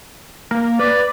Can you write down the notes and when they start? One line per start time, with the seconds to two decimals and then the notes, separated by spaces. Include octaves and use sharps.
0.51 A#3
0.79 B4 D5